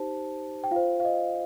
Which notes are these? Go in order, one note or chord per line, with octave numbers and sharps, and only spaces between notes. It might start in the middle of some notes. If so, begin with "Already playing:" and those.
Already playing: D#4 G4 C5 A5
G5
F4 C5 F5
F5
D#5